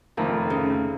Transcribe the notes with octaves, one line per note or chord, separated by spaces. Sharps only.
F1 F2 D#3 A3 A#3
C#3